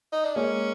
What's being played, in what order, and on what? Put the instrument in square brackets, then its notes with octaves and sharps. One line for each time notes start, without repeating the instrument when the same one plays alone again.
[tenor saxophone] D#4
D4
[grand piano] G#3 A#3 [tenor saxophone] C#4